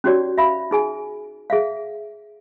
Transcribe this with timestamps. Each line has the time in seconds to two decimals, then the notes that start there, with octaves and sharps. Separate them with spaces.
0.04 C#4 D#4 F#4 G4 C#5 D5
0.38 E5 F5 B5
0.71 D#4 G#4 G#5
1.50 G#4 E5 F5